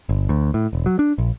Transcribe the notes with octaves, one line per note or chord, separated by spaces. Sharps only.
G1
D2
A2
E1
F#3
D4
A#1